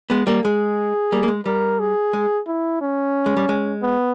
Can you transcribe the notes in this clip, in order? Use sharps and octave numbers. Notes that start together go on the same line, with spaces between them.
G#3 B3
G3 A#3
G#3 G#4
G3 A#3
A#3
G#3
G3 A#4
G#4
G#3
E4
C#4
G#3
G3
G#3
B3